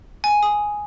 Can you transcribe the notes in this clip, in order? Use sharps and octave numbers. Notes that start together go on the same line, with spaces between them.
G#5
D#6